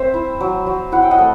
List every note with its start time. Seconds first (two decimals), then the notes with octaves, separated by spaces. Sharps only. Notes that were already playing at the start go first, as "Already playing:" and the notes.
Already playing: C4 C5 E5
0.14 E4
0.41 F#3
0.67 F#3
0.92 E4 F#5
1.02 G5
1.11 D#5 F#5
1.19 A3